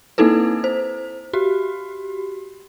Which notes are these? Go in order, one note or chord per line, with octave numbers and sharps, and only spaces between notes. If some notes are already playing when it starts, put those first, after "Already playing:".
A#3 C4 D#4 E4 A4 B4
C5
F#4 G4